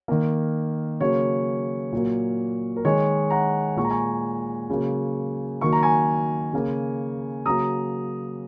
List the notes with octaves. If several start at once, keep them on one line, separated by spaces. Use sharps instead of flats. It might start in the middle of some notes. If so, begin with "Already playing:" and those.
D#3 A#3
C#3 F#3 A#3 C#5
A#2 F#3 A#3
A#4
D#3 G#3 C#5
F#5 A#5
A#2 G#3 C#6
A#5
G#5 C#6
C#3 F#3 A#3
D#3 F#3 A#3 C#6
A#5
G#5 C#6
C#3 A#3
C#3 F#3 A#3 A#5 D#6